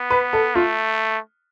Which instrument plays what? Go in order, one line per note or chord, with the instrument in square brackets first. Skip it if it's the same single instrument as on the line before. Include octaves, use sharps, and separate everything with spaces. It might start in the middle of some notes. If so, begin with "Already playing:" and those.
Already playing: [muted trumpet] B3
[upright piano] B4
A4
[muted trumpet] A3 [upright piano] F4